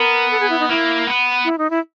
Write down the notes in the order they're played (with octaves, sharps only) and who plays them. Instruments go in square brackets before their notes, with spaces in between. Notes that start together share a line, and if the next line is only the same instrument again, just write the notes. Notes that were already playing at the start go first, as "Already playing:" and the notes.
Already playing: [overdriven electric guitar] B3 [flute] A#4
[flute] A4
G#4
E4
D#4
[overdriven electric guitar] A#3 [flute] E4
[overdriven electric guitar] B3
[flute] E4
D#4
E4